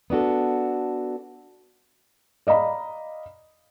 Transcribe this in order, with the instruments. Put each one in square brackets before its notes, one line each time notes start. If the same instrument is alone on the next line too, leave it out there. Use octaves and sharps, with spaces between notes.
[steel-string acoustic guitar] B3 D4 F#4 A4
[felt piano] D5 D#5 F5 A#5 B5